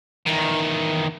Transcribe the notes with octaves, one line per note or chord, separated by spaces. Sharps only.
E2 D#3